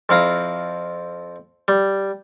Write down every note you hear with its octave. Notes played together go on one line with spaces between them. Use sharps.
F2 E4 F5 A#5
G3